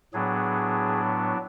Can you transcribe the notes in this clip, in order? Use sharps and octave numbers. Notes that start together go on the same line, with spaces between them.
A2 F#3 B3 D4 G#4